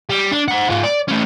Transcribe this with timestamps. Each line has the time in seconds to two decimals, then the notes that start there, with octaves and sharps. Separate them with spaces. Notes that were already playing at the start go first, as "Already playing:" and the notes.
0.10 G3
0.32 D4
0.48 C5 F#5
0.70 G#2 F4
0.84 D5
1.08 A3 C#4